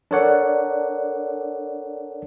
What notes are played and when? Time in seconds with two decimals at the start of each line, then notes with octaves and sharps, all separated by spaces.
0.11 D4 A4 A#4 C#5 D5 F#5